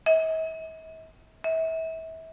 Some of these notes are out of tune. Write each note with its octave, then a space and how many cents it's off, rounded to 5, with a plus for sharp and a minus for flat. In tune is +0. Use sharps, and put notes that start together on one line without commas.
E5 -45
E5 -30